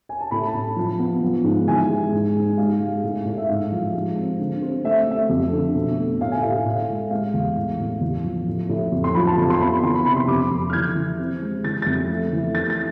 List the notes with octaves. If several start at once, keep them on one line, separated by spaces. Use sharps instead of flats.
G#5
A5
A2 B5
A5
A2
F3
B3
F3
G#2
E3 G#5
G#3
G#2
G#2
G#3 F5
G#3
A2
A2
E5
G#2 F5
F3
G#3
C4
D3
C4
A3 E5
A3 E5
F2
D3
B2
A3
A2 F5
G#5
A2 F5
A2
G#3
G#3 F5
E2
A2
A2
E2
F3
A2
A2
F2
C6
F3 B5
A5
F2
C6
B3 B5
E3 C6
B5
C3 B5
C6
F2 D6
F2
F6
E3 G#6
E3
C4
G#3
E3 A6
F2 A6
A3
E3
A3 A6
A6